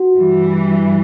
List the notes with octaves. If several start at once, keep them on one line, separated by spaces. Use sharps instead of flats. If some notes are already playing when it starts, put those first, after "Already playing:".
Already playing: F#4
G2 E3 G3